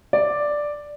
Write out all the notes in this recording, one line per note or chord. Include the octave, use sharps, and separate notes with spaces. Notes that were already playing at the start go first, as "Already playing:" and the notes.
D5